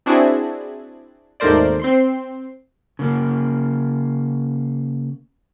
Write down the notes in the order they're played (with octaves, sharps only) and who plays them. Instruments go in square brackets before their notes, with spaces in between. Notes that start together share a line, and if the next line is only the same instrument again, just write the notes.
[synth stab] C4 D4 E4 F#4 G#4
G#1 D#2 A3 A#4 C5 D5
C4 C6 C7
[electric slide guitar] C#3 A#3